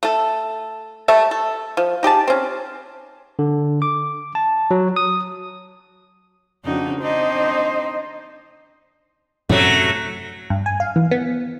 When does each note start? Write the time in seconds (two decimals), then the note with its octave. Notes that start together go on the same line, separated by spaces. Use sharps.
0.03 A3 A4
1.08 G3 A3 A4 E5
1.31 A4
1.77 F3
2.03 D#4 G4 G#4 A5
2.27 C4 C#4
3.39 D3
3.82 D6
4.35 A5
4.71 F#3
4.96 D#6
6.65 F2 C#3 D4 D#4 F#4
7.01 C4 D4 D#4 C5 D#5
9.49 F#2 A2 C3 F#3 A3
10.50 G2
10.66 G#5
10.80 F5
10.96 E3
11.11 B3